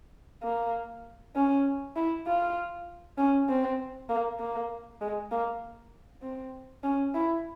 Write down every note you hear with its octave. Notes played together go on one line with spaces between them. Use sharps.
A#3
C#4
E4
F4
C#4
C4
A#3
A#3
G#3
A#3
C4
C#4
E4